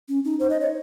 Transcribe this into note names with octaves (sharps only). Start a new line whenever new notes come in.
C#4
D#4
C5
D#5
C#5